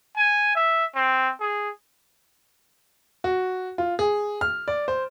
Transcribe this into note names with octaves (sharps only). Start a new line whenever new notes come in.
G#5
E5
C4
G#4
F#4
F4
G#4
F6
D5
C5